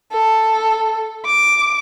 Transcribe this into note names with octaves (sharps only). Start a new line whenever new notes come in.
A4
D6